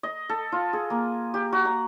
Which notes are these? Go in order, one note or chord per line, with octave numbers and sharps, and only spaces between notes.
D#5
A4
F4
G#4
A#3
G4
F#4
A#5